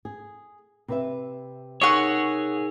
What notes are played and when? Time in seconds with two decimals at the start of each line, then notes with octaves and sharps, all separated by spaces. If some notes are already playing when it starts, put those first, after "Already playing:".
0.05 G#4
0.88 C3 B4 E5
1.82 D#4 G#4 A#4 C#5 F#5 C#6 E6